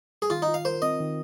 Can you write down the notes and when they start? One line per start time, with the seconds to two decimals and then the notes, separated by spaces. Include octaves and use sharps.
0.22 G#4
0.30 D#3 F4
0.42 D#4
0.48 F4
0.54 F5
0.65 A#4 C5
0.82 C4 D#5
1.00 D#3